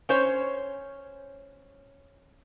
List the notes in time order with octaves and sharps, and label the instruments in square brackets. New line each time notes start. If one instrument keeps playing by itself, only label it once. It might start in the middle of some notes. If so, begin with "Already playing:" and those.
[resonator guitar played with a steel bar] C#4 C5 C#5